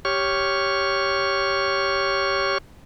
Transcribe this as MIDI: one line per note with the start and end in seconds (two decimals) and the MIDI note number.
0.05 2.58 67
0.05 2.58 73
0.05 2.58 85
0.05 2.58 89